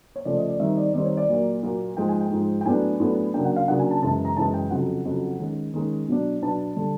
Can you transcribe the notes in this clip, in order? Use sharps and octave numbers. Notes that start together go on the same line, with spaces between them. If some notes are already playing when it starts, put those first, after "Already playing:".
C#5
C#3 F3 A3 C#4 D5
D#5
D5
D#3 G3 C4 D#4 E5
D5
D#3 G3 C4 D#4 D5
C#5
D5
A#2 F#3 A#3
A#2 F#3 A#3
G#2 F3 G#3 G5
G#5
G5
G#2 F3 G#3
G5
A2 F#3 B3 D4 G#5
A2 F#3 B3 D4
C#3 F#3 A#3 D4 G5
F#5
F5
C#3 F#3 A#3 D4 F#5
G#5
A5
F#2 C#3 E3 G#3 A5
A#5
F#2 C#3 E3 G#3 A5
G5
F2 C#3 F#3 F#5
F2 C#3 F#3
D#3 G#3 C#4
D#3 G#3 C#4
B2 F#3 B3 D4
B2 F#3 B3 D4 A5
D3 G3